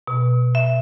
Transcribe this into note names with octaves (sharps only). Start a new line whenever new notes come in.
B2
E5